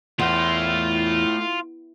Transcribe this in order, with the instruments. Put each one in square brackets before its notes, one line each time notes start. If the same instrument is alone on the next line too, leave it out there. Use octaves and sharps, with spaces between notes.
[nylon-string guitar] E2 [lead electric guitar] A3 E4 [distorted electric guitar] F4